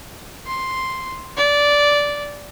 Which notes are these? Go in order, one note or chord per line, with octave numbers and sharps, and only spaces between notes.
C6
D5